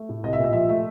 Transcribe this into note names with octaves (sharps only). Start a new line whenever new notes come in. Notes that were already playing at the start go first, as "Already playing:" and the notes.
Already playing: A3
A2
C2 D#5
E5
A#2
D#5
F3 E5
A3 E5